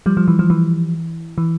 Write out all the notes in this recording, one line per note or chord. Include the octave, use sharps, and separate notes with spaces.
F3 G3
F3
E3
F3
E3
E3